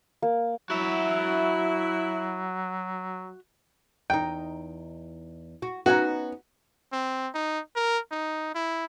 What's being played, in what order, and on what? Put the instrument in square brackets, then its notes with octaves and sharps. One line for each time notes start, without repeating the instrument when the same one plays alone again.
[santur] A#3
[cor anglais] F#3 [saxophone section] E4 [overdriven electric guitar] F#4 E5
[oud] E2 D#4 [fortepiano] G5
[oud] F#4
[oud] B3 C#4 D#4 [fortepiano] F#4
[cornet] C4
D#4
A#4
D#4
E4